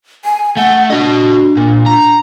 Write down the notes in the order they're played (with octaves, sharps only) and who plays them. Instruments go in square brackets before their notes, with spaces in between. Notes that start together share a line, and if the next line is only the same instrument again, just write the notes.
[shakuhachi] G#5
[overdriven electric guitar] A3 [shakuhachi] F#5
[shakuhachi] D4 [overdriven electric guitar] F#4 D#5
[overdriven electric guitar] A#2
A#5